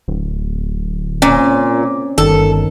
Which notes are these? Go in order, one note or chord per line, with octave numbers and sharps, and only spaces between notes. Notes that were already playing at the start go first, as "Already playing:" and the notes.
D1
A#2 C4 C#4
G1 D#3 A4